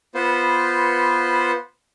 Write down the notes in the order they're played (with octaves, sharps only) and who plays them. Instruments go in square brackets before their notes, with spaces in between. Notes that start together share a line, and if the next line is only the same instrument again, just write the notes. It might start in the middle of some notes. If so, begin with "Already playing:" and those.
[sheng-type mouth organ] B3 F4 B4 C5